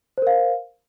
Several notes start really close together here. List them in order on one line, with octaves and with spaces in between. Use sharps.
C5 A#4 F5